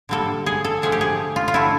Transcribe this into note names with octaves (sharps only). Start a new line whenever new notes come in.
D3 G3 A#3 A4
G#4
A4
D3 F3 A3 G#4
G4
G#4
F4
F4
D3 F#3 A3 E4